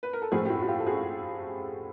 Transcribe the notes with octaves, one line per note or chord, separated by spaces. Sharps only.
B4
A#4
A4
A2 F3 A3 F#4 G#4
G4
E4 F#4
F#4
F4 G4
A4
F#4 G#4